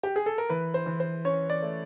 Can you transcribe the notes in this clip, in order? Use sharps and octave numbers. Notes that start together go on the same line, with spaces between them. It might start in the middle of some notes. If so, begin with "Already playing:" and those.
G4
G#4
A4
A#4
E3 B4
C5
E3
C5
C#4 C#5
D5
A3